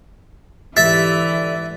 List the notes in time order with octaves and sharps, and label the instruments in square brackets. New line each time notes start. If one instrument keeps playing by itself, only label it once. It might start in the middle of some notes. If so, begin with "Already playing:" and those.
[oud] G#2 D3 G4 [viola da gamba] E3 [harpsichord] E5 [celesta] A6